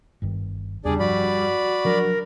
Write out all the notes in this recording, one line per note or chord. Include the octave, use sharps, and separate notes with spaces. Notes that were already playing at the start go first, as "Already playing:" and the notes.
G1 G2 D#3
E2 C#3 G3 D4 G#4 D5
G2 F3 F#4 D5 B5
F3 F#3 D4 A#4